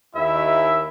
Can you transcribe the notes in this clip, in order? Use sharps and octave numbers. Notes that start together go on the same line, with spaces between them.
D#2 E4 E5